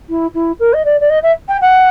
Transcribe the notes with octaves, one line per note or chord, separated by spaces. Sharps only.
E4
E4
A#4
D#5
D5
D5
D#5
E5
G5
F#5